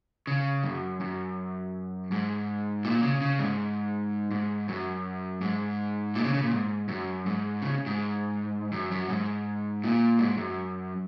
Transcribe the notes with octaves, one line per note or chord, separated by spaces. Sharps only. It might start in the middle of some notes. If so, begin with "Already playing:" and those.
C#3
F#2
F#2
G#2
A#2
C#3
C#3
G#2
G#2
F#2
G#2
A#2
C#3
C#3
A#2
G#2
F#2
G#2
C#3
G#2
F#2
F#2
G#2
A#2
G#2
F#2